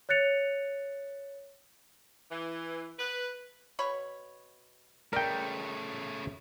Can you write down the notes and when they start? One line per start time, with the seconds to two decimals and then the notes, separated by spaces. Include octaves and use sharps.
0.09 C#5 F#6 A6 C#7 F7
2.31 E3
2.99 B4
3.79 B2 C#5 B5
5.13 C#3 A3 A#4 D5 G5